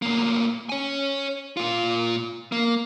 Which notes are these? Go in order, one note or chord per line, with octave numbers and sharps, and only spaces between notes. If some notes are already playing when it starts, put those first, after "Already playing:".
A2 A#3
C#5 G#5
A#2 F4
A#3